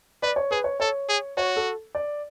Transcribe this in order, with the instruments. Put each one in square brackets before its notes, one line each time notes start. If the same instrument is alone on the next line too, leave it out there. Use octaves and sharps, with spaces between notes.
[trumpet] B4 [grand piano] D5
[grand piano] C#5
[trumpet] G#4 [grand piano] B4
[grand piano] C#5
[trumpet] A4 [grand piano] C#5
[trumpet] G#4
[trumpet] F#4 [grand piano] C#5
[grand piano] A4
D5